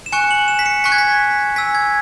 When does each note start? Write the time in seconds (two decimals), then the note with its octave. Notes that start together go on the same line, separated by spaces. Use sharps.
0.06 E7
0.12 G#5 C#6 F#6 C#7
0.31 F#7
0.48 E7
0.59 B6
0.66 C#7
0.84 G#5 C#6 F#6 B6
0.92 G#6
0.98 B6
1.56 G#5 E6 B6
1.75 G#6